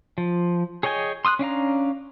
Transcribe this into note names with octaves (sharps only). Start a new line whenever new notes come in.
F3
G#4 C#5 D#5 G5 G#5
C6 D#6 E6 F#6
C#4 D4 F5 A#5